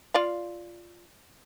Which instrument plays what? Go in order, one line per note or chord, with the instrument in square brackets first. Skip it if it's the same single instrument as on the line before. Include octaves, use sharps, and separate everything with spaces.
[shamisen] F4 D5 F5